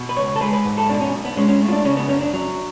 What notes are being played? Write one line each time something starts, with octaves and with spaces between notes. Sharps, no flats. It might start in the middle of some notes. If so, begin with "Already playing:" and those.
Already playing: B2
B4
C#2 C#5
A4
G#3 B4
B4
G#2
A4
B2 D4
C#4
B1
B3
G#3 C#4
C#4
A2
F4
D4
C#3 C#4
B3
F#2 C#4
D4
F#3